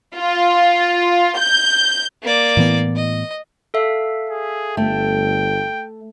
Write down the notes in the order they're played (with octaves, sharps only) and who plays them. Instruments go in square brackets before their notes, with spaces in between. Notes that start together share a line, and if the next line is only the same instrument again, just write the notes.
[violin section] F4
G6
[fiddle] A#3 D5
[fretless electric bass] A2 E3 B3
[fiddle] D#5
[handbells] A4 E5 F5
[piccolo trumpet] G#4
[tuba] G1 [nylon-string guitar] A3 [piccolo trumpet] G5